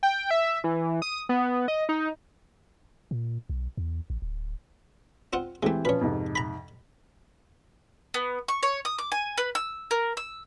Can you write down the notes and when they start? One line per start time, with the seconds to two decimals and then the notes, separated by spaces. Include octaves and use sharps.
0.03 G5
0.31 E5
0.64 E3
1.02 D#6
1.29 B3
1.68 D#5
1.89 D#4
3.11 A#2
3.49 B1
3.77 E2
4.10 A1
4.22 D1
5.33 C4 F4 F#5
5.63 E3 G#3 A3 C4 G4
5.85 F3 C#4 B4 C#5
6.01 F2 G#2 C3
6.36 A#5 B5
8.14 B3
8.48 C#6
8.63 C#5
8.85 D#6
8.98 D6
9.12 G#5
9.38 B4
9.55 E6
9.91 A#4
10.17 E6